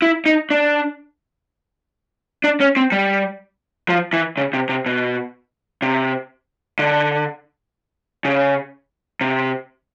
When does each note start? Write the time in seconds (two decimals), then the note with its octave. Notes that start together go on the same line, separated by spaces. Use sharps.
0.02 E4
0.26 D#4
0.50 D4
2.44 D4
2.60 C#4
2.76 C4
2.92 G3
3.89 F3
4.13 E3
4.37 C#3
4.53 C3
4.69 C3
4.86 B2
5.82 C3
6.79 D3
8.25 C#3
9.21 C3